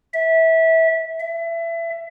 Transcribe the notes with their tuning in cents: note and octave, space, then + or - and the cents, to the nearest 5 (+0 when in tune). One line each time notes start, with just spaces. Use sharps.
E5 -20
E5 +25